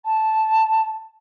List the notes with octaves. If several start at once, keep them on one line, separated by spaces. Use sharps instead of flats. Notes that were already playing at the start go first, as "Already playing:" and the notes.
A5